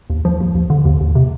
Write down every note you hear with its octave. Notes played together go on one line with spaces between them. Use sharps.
D#2
F3
D#2
D#2
D3
D#2
D#2
C3